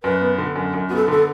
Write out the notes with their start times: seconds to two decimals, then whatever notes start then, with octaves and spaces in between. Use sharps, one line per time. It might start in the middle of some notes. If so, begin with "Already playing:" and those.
0.03 F#2 B4
0.21 B3
0.38 D3
0.56 F#2
0.74 F#2
0.89 B3 F#4
0.96 A4
1.08 D3 A4